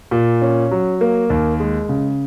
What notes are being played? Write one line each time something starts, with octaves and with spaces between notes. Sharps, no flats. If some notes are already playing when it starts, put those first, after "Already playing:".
A#2
C#4
F#3
A#3
D#2
G#3
C#3